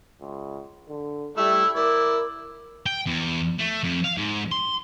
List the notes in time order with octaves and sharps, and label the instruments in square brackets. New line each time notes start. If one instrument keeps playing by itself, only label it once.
[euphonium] C#2
D3
[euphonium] G3 [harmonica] A3 E4 E6
[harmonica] E4 D5 [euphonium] A#4
[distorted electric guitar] G5
E2
A3
F2
F5
G#2
C6